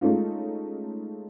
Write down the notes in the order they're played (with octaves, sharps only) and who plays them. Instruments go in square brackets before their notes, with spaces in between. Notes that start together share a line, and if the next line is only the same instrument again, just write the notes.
[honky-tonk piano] G#3 A3 C#4 D#4 F4